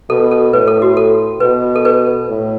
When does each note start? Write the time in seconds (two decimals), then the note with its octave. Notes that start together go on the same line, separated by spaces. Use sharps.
0.10 B2 A4
0.32 A4
0.53 A2 B4
0.67 A4
0.82 F#4
0.97 A4
1.40 B2 B4
1.76 A4
1.85 B4
2.29 A2